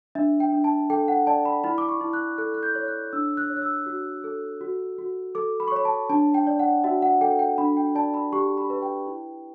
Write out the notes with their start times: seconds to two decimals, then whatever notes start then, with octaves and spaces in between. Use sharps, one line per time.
0.15 D4 E5
0.40 G5
0.52 D4
0.64 A5
0.90 A4 G5
1.08 F#5
1.27 D5 A5
1.46 B5
1.64 E4 B5
1.78 D6
1.89 C#6
2.01 E4
2.13 F#6
2.38 A4 F#6
2.54 F#6
2.63 G6
2.75 C#5
2.88 F#6
3.13 D4 E6
3.37 F#6
3.50 C#5
3.57 F#6
3.62 E6
3.86 F#4
4.24 A4
4.61 F#4
4.98 F#4
5.35 A4 D6
5.60 B5
5.68 C#6
5.72 C#5 B5
5.85 A5
6.10 D4 A5
6.34 G5
6.47 D5
6.59 F#5
6.84 F#4 E5
7.02 F#5
7.21 A4 G5
7.39 G5
7.58 D4 B5
7.77 G5
7.95 D5 A5
8.14 B5
8.33 G4 C#6
8.58 B5
8.70 B4
8.82 G5
9.07 E4